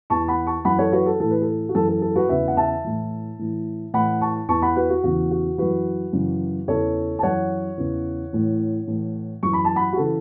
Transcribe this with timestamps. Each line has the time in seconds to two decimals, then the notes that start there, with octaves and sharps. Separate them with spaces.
0.10 E2 E3 A5 C#6
0.28 F#5 B5
0.47 A5 C#6
0.65 F#2 E3 F#5 B5
0.79 A4 C#5
0.92 F#4 B4
1.06 A4
1.20 A2 E3 A4
1.31 B4
1.42 A4
1.69 F#4
1.75 F#2 E3 A4
1.88 A4
2.02 A4
2.16 F#4 B4
2.29 E2 C#3 E3 B4 E5
2.48 F#5
2.57 E5 A5
2.84 A2 E3
3.39 A2 E3
3.94 A2 E3 F#5 B5
4.21 A5 C#6
4.49 E2 E3 A5 C#6
4.62 F#5 B5
4.76 F#4 B4
4.90 F#4
5.04 E2 C#3 E3 F#4
5.31 F#4
5.58 F#2 E3 F#4 B4
6.13 F#2 C#3 E3
6.68 E2 C#3 E3 A4 C#5
7.19 A5
7.23 F#2 E3 C#5 F#5
7.78 E2 C#3 E3
8.33 A2 E3
8.87 A2 E3
9.43 F#2 E3 C#6
9.53 B5
9.65 A5
9.76 F#5 B5
9.93 F#4
9.97 C#3 E3 A4